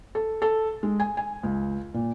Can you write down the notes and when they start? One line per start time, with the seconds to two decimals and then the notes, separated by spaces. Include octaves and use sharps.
0.15 A4
0.42 A4
0.83 G#3
1.00 G#5
1.17 G#5
1.43 C#2
1.94 A#2